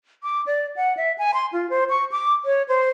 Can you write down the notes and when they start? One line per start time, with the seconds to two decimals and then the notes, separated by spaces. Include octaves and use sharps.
0.23 D6
0.46 D5
0.76 F#5
0.97 E5
1.18 G#5
1.34 C6
1.53 F4
1.70 C5
1.89 C#6
2.12 D6
2.45 C#5
2.68 C5